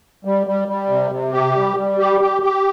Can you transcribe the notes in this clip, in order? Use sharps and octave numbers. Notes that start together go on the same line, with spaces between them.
G3
G3
G3
C3
C3
G4
G3
G3
G4
G4
G4